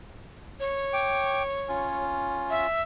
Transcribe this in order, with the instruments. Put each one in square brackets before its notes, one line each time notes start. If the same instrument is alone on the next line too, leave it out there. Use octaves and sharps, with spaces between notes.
[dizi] C#5
[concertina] G5 D6
C#4 F4
[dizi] E5